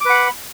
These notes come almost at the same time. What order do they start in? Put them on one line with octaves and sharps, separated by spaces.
D6 B4 F#5 B5